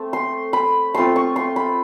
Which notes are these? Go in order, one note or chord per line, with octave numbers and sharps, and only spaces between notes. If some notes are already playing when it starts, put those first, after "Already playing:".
Already playing: A3 C4
C6
B5
A3 C4 F4 C6
C#6
C6
B5